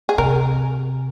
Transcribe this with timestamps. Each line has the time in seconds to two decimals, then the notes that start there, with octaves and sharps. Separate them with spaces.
0.09 G#4
0.18 C3 A#4